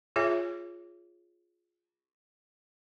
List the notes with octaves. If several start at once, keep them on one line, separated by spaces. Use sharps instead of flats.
F4 G#4 C#5 E5 G#5